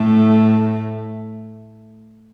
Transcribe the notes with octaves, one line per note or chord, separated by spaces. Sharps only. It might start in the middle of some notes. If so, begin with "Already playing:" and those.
Already playing: A2 A3